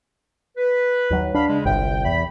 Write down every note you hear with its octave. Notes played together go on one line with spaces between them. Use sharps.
B4
D#2 F#3
D4 F5 B5
C#3 G#3
G1 C2 G5
E2 B5